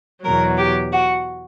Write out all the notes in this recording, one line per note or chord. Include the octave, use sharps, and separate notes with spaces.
E2 B2 F#3 A#4
G4
F#4